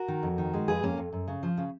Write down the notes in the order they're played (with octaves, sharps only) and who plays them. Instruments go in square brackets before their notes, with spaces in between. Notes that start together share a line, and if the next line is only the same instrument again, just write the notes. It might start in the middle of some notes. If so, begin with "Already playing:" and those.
Already playing: [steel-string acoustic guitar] F#4 A#4
D#3
F2
D#3
G#3
F2 G#4 B4
F2 A#3 C#4
F2
F#2
C#3
F3
C#3